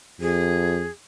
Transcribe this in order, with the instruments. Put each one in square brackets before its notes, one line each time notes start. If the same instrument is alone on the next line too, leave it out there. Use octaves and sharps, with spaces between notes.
[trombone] F2 [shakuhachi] G#4